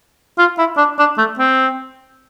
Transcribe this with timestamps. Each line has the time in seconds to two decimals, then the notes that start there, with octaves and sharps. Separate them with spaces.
0.39 F4
0.58 E4
0.78 D4
0.99 D4
1.18 A3
1.39 C4